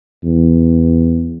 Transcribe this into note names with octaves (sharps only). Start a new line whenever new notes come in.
E2